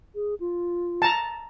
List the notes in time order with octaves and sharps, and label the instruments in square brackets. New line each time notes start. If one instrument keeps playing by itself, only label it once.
[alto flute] G#4
F4
[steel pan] A5 A#5